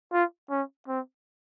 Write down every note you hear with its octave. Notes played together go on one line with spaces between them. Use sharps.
F4
C#4
C4